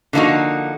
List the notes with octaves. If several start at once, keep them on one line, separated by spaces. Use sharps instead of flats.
D3 F3 A#3 D#4 F#4